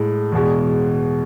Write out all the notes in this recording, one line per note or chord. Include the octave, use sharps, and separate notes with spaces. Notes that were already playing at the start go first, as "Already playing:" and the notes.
Already playing: A2 G#3
E2 B2 G#3